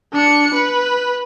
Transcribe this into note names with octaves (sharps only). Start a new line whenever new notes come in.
D4 C#7
B4